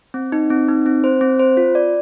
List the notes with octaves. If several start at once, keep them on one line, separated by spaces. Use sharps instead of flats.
C4
D#4
C4
D#4
C4
C5
C4
C5
F4
D5